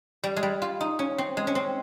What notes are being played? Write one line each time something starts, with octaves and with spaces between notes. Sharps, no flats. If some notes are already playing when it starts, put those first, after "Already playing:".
G3
G#3
G3
F4
D#4
C#4
C4
G#3
C#4
C4